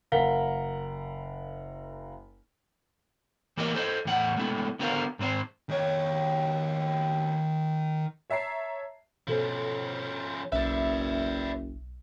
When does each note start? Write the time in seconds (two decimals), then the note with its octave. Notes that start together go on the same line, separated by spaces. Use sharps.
0.12 F#1 A#4 F5 F#5 B6 G7
3.57 E3 A#3 A#4 D#5
3.74 A4 C5 D5 D#5
4.05 E2 A2 F4 F#5
4.36 G#3 A3 B3 E4
4.79 D3 B3 F#4 A#4 C5 F5
5.19 G#2 G#3 C4 C5
5.69 D#3 C#5
8.30 C#5 E5 A5 A#5 C7
9.27 B2 F3 C#4 A4 C5
10.52 F#1 B1 B4 D5 E5